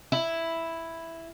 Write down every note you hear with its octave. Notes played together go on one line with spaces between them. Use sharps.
E4